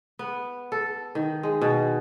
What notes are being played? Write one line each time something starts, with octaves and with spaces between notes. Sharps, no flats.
B3
A4
D#3
G#3
B2